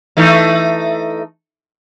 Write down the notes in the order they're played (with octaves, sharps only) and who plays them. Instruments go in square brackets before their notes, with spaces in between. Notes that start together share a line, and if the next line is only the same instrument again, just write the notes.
[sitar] E3 A3 D#4